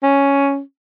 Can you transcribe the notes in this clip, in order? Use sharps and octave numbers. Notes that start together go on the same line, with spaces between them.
C#4